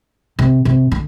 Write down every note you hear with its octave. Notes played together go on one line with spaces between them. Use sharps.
C3
C3
D3